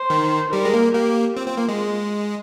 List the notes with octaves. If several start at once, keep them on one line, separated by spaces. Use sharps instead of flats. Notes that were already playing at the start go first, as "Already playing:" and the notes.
Already playing: C5
D#3
G3 A#4
G#3
A#3
A#3 G4
C4 F4
C4
A#3
G#3